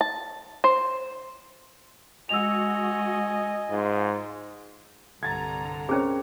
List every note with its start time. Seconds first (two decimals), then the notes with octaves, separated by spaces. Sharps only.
0.01 A5
0.64 C5
2.29 G#3 F#4 D#5 G#5 E6 F7
3.70 G#2 F4
5.23 C2 G2 D3 A#5 G#6 A6
5.89 C4 C#4 G#4 A#4 C#5